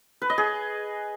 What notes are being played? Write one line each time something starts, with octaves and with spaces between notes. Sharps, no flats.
B4
D#5
G#4